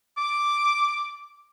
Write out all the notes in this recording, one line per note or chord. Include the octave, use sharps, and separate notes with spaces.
D6